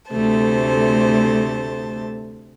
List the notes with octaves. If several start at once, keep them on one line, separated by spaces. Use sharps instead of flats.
D2 C3 A3 C5 A5